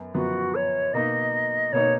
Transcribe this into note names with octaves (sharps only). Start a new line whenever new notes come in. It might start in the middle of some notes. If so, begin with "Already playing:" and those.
Already playing: F#2 B3
F#2 F3 B3 F#4
C#5
B2 A#3 D#4 D#5
B2 A#3 D#4 C#5